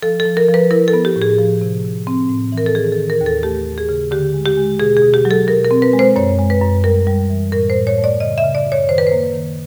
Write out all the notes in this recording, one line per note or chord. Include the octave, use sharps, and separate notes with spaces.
F3 A4
A4
F3
A#4
F3
B4
E4 A#4
A4
B3
G4
A2
G#4
F3
C3
C3
C4
A2
E3
A#4
A4
D#3 G#4
A4
D#3
A#4
D#2
A4
A3 G4
A3
G#4
C#3
D3 G4
G#3
G4
G#3
B2 G#4
G#4
B2
G4
F#3
A4
B2 A#4
A#4
C4
B4
G#3
C5
F#2 C#5
G#3
B4
F#2
G3 A#4
G3
E3
A2 A#4
C5
A2
C#5
A3
D5
C#3 D#5
E5
C#3
D5
F#2
C#5
D#3 C5
B4
A#3 C5
D#3